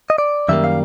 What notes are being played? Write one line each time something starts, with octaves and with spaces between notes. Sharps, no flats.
D#5
D5
F#2 D#3 G3 A#3 E5
F5